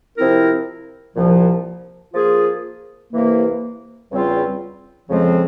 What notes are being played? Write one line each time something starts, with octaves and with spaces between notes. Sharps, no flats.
C3 F3 C4 E4 A#4
C2 A#2 F3
F3 A#3 F4 G#4
C2 C3 E3 A#3
E2 C#3 G3 C4 F4
F2 C#3 F3 G#3 C4